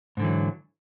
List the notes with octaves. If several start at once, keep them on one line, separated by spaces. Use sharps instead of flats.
G#2 D3 E3 F#3